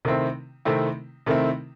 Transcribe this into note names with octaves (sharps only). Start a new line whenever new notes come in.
C3 D#3 A3 C4 E4
C3 D#3 A3 C4 E4
C3 D#3 A3 C4 E4